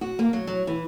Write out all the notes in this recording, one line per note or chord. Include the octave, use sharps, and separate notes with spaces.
F#4
A#3
F#3
F#3
E3